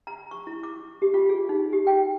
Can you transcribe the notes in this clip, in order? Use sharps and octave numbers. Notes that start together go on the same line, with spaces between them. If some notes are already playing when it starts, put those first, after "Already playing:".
A#5
C#6
E4
D6
G4
F4
G#4
D#4
G4
G5